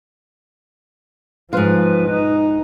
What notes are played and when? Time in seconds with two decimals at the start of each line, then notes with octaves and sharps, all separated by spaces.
1.53 G#2 F3 F4 B4
2.09 D#4